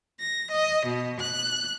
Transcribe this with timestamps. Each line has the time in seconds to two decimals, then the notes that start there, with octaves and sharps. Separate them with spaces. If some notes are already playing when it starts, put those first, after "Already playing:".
0.19 A#6
0.51 D#5
0.86 B2
1.19 F#6